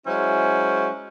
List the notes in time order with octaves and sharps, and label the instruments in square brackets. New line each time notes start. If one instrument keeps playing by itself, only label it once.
[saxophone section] F#3 G#3 C#4 E4 C5